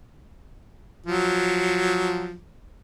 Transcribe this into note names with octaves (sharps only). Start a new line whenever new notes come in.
F3 F#3